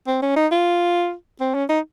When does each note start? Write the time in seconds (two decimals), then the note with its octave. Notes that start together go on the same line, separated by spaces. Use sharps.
0.07 C4
0.23 C#4
0.36 D#4
0.52 F4
1.41 C4
1.54 C#4
1.69 D#4